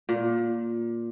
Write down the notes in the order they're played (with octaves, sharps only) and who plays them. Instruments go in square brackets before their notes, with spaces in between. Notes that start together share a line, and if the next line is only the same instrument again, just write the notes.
[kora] A#2